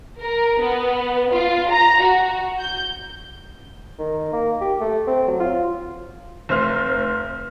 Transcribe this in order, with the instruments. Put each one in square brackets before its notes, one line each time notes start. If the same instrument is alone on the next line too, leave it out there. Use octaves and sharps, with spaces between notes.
[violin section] A#4
B3
F4
A#5
F#4
G6
[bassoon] D#3
A#3
G4
A3
C4
F#3
F4
[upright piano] F1 C5 F6